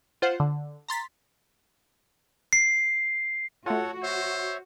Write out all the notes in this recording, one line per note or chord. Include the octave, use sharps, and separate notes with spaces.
F4 C5 F#5
D3
A#5 C6 A6 B6
C7
A3 F4 F#4 A4 C#5 F#5
C5 C#5 E5